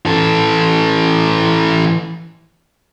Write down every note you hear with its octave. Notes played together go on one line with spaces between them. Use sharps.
E3 A4